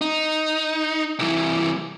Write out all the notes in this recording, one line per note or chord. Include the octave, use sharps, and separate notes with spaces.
D#4
C2 E3